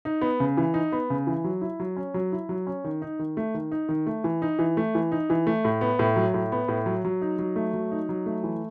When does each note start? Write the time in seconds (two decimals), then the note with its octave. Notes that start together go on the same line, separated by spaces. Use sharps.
0.05 D#4
0.21 B3
0.40 C#3
0.57 E3
0.74 D#4
0.92 B3
1.10 C#3
1.27 E3
1.44 F#3
1.61 E4
1.80 F#3
1.97 C#4
2.14 F#3
2.32 E4
2.49 F#3
2.67 C#4
2.84 D#3
3.02 D#4
3.19 D#3
3.37 A3
3.54 D#3
3.72 D#4
3.89 D#3
4.07 A3
4.24 E3
4.42 D#4
4.59 E3
4.77 A3
4.95 E3
5.12 D#4
5.30 E3
5.47 A3
5.65 A2
5.81 B3
5.99 A2
6.16 F#3
6.34 A2
6.52 B3
6.68 A2
6.86 F#3
7.05 F#3
7.22 D#4
7.39 F#3
7.56 A3
7.74 F#3
7.92 D#4
8.09 F#3
8.26 A3
8.43 E3